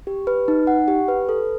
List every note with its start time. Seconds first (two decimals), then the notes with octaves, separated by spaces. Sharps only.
0.07 G4
0.27 B4
0.48 D#4
0.67 F#5
0.88 G4
1.08 B4
1.29 A4